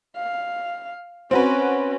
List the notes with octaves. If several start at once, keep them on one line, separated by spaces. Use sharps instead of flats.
F5
C4 C#4 F#4 B4